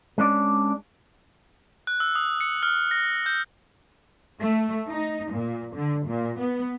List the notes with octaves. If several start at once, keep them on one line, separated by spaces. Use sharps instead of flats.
G#3 C#4 D4 D5
F#6
E6
D#6
C#7
F6
A#6
G6
A3
D#4
A#2
D3
A#2
B3